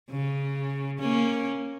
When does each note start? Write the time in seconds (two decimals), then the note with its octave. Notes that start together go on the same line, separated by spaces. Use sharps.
0.11 C#3
1.00 A#3 C#4